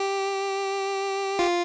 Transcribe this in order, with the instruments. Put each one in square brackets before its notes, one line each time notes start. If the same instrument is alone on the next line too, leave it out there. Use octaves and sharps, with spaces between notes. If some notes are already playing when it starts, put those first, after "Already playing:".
Already playing: [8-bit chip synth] G4
F4